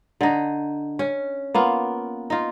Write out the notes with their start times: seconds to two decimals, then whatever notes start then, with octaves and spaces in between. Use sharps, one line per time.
0.21 D3 D#4
0.99 C#4
1.54 A#3 B3 F4
2.30 D#4 F4